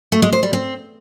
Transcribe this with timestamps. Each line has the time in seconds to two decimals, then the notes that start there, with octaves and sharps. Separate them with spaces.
0.12 A3
0.22 G#3
0.33 C5
0.43 G3
0.53 C4